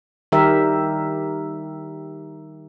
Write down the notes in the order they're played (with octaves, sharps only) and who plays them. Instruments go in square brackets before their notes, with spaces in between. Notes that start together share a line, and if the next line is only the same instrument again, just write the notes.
[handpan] D#3 G3 G4 A#4 E5